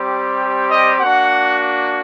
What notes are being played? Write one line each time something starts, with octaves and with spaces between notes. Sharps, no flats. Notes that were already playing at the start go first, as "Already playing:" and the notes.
Already playing: G3 C4 G4
D#5
A#3 D4 F#4 F#5